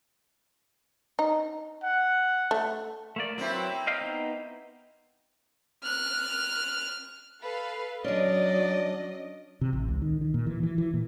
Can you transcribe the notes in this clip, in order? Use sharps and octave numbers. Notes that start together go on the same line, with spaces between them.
D#4
F#5
A3
A3 A#3 D5
F#3 A#3 C4 E4 B4
D#5 F5 G5
B3 D#4
F6 F#6
A4 B4 F5
F#3 C#4 D4 D5 D#5
C3
A1
C#2
D#3
D#3
A#2
E3
E3
E3
A#2